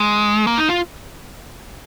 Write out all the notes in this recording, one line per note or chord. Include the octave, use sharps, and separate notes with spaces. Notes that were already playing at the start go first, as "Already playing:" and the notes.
Already playing: G#3
A#3
D#4
F4